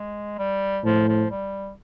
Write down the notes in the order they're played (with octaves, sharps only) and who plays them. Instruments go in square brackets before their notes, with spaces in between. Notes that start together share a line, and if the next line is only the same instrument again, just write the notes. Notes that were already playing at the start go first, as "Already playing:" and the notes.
Already playing: [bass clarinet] G#3
G3
[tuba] A2 [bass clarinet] F3
[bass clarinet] F3
G3